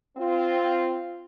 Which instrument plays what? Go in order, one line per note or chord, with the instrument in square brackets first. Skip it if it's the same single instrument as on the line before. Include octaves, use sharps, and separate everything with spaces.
[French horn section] C4 F4